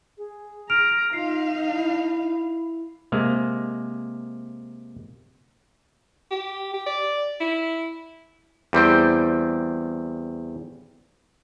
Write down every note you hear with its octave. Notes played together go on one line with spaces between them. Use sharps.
G#4
A#5 F6 D7 F7
D#4 F4 F5 C7
E4
C3 G#3 A#3
G4
G4
D5
E4
E2 G3 C4 G5